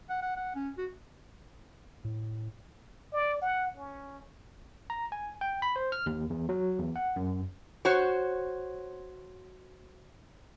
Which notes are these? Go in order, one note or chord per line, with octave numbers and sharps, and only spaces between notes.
F#5
F#5
F#5
C#4
F#4
A2
D5
F#5
C#4
A#5
G#5
G5
B5
C5
F6
D#2
E2
F#3
E2
F#5
F#2
F#4 C5 C#5